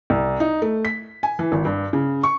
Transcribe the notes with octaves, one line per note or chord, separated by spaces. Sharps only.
C2
D#4
A3
B6
G#5
E3
G#1
G2
C#3
C#6